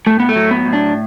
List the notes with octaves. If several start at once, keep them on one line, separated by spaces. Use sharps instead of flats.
A2 A3
B3
A3
F#3
B3
A2
D4